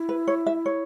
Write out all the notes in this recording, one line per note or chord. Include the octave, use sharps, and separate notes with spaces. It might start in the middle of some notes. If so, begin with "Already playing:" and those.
Already playing: E4
B4
C#5
E5
C#5